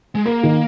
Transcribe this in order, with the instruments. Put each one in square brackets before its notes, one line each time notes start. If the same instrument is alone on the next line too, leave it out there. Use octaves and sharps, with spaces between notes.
[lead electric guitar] G#3
[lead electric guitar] A#3 [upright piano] A#4
[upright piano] D#3